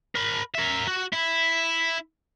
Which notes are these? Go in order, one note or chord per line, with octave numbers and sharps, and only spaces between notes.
A#4 B5
A#4 E5
F#4
E4